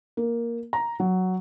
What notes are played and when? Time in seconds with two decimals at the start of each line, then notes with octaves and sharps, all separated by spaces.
0.17 A#3
0.73 A#5
1.00 F#3